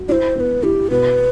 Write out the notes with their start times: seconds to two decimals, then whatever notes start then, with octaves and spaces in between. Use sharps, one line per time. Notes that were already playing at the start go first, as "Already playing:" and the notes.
Already playing: F#4
0.09 E4 C5 D5
0.36 B3 C5
0.40 B4
0.63 E4 G4
0.90 B2 B4